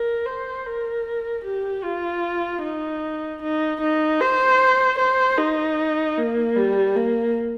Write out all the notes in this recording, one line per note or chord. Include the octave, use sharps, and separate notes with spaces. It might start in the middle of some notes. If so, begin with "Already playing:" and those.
Already playing: A#4
C5
A#4
G4
F4
D#4
D#4
D#4
C5
C5
D#4
A#3
G3
A#3